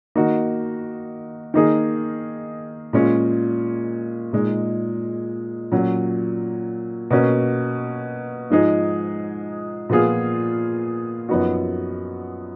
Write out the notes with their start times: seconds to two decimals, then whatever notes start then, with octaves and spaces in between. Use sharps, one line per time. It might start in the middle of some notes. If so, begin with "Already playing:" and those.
0.15 D#3 A#3 D#4 F#4
1.54 D#3 A#3 D#4 G#4
2.93 A#2 G#3 C#4 F4
4.33 A#2 G#3 D#4
5.72 A#2 F#3 C#4
7.11 B2 A#3 C#4 F#4
8.50 G#2 F3 G#3 D#4 G#4
9.90 A#2 F3 B3 F4 G#4
11.29 F#2 F3 B3 D#4 F#4